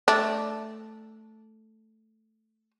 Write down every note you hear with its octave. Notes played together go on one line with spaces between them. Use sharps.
A3 D4